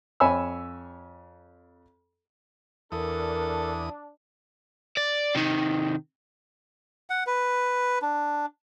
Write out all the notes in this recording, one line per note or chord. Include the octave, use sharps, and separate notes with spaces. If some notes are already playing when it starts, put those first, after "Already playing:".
F2 C#5 G#5 B5 E6
E2 D4 A4 A#4 D#6
D5
C3 D#3
F#5
B4
D4